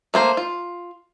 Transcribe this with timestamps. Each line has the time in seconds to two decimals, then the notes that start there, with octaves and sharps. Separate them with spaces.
0.14 A3 A#3 C5
0.37 F4